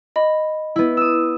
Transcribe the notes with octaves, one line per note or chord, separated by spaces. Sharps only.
D#5 B5
B3 E4
D#6 E6